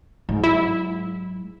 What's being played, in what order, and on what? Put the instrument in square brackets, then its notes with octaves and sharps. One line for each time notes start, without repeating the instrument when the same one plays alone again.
[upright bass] G#2 F#3
[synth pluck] E4